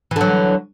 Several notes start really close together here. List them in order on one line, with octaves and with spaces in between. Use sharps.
E3 D3 F#3